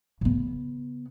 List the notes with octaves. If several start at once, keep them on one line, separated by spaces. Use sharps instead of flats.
C#3 B3